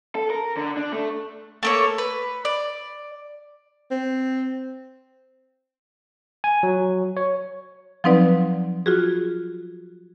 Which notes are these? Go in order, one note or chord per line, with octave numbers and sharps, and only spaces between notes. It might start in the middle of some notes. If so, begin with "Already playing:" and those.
A4
A#4
D3
D4
A3
A3 A#3 C#5
B4
D5
C4
G#5
F#3
C#5
F3 F#3 C4 D#4 B4 D5
F4 F#4 G#4